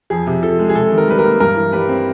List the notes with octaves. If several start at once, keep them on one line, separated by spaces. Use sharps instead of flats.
F2 G#4
C3
F3 A4
G#3
G#4
C3 A4
D#3
A#4
G3 B4
A#4
A#3
G2 A#4
E3
G3 B4
C4